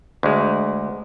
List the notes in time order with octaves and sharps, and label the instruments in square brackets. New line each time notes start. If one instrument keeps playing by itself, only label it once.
[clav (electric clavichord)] D2 G#3